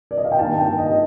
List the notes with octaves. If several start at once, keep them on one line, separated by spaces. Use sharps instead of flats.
D5
D#5
F5
G5
G2 D#3 A#3 A5
G5
D#5
D#5